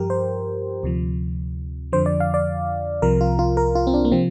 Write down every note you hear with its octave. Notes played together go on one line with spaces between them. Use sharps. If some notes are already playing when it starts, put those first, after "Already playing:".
Already playing: G2 F3 G4 A#4
C5
D2 C3 F3
F2 D3 F3 C5
D5
F5
D5
C2 C3 F3 A#4
F4
F4
A#4
F4
C4
D4
A#3
C3 F3 C4